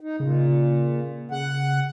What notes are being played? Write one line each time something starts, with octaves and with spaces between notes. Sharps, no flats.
D#4
A#2 C#3
C#3 F#5